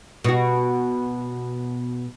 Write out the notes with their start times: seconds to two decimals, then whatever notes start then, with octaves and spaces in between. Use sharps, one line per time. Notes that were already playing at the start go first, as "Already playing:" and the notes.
0.24 B2 F#4